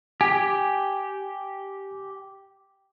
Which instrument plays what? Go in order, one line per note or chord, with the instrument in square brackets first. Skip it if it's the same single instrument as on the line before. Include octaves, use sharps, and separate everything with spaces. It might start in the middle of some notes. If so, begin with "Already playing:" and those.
[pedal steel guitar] G4 [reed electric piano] G#5